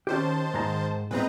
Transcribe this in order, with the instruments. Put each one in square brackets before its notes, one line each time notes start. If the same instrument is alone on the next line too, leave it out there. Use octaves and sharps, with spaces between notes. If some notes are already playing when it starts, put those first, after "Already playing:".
[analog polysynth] D#3 C5 A5 [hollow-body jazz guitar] C#4 G4
[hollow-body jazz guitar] G#2 A#5
[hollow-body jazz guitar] A#2 G#3 C4 [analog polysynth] B4 D#5 A#5